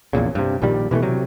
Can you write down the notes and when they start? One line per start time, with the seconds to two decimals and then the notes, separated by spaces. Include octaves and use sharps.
0.13 A#1 E2 A#2 C#3
0.35 G2 C3
0.62 A#1 A#2 D#3 G3
0.91 B2 E3 G3 A3
1.02 C3 F#3